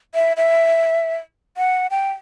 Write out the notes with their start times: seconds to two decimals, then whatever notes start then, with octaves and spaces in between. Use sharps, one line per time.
0.15 E5
0.37 E5
1.57 F#5
1.91 G5